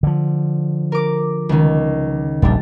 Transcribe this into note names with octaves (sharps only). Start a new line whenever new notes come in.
D3 F3
A#4 D6
C#2 D#3
D#1 A#1 G3 D4